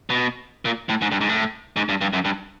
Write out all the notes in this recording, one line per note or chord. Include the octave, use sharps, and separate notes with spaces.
B2
A#2
A2
G#2
G2
G#2
A2
G#2
G2
G2
F#2
G2